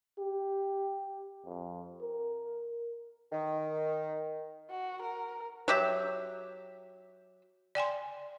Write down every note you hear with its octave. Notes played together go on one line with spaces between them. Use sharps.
G4
F2
A#4
D#3
F#4
A#4
F#3 G4 E5
D5 G5 G#5 C6